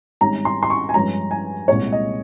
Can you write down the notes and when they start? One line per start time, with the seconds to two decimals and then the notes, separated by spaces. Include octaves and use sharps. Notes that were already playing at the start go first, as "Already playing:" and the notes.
0.21 G#1 G#2 G3 C#4 A#5
0.45 C6
0.63 C6
0.70 C#6
0.89 G#5
0.94 G2 F3 G#3 C#4 A#5
1.31 G#5
1.68 C2 A#2 G#3 C#5
1.92 D#5